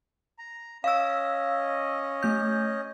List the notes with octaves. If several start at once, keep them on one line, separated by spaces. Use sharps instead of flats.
A#5
C#4 D#5 F5 E6
A3 G6